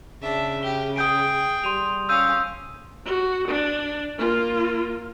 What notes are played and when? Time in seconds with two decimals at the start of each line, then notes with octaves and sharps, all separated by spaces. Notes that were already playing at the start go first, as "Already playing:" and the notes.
0.22 C#3 D4 E5
0.63 G4 G7
0.96 G#4 G5 D#6 G6 D7
1.64 G3 C6 D#7 F7
2.09 C#4 F5 E6 G6 D#7
3.06 F#4
3.48 D4
4.17 A#3 F4